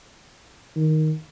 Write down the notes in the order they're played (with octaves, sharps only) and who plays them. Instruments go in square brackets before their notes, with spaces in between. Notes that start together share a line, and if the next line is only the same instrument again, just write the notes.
[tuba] D#3